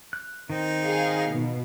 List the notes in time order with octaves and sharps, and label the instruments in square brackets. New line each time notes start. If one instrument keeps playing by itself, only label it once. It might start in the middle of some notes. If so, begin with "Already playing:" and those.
[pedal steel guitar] F#6
[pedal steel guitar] D#3 [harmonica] C4 D#4
[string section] G#4 F5
B2